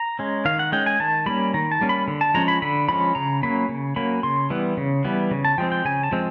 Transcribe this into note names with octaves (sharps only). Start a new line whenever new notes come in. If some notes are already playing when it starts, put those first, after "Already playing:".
Already playing: A#5
G#3 C#4
D#3 F5
F#5
G#3 C#4 G5
G#5
D#3 A5
G3 A#3 C#4 B5
D#3 A#5
A5
G3 A#3 C#4
B5
D3
A5
F3 G#3 C#4 A#5
B5
D3 B5
F3 G#3 C#4 B5
C#3 A#5
F#3 A#3 C#4 B5
C#3
F#3 A#3 C#4 B5
C#3 C6
E3 G3 B3
C#3
E3 G3 B3
C#3
A5
F3 G#3 C4 G5
G5
C#3 G#5
A5
F3 G#3 C4